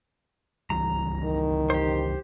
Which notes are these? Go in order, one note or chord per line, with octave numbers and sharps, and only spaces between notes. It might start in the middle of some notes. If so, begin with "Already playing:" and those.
C#2 E3 G3 A#5
D#3
G4 C5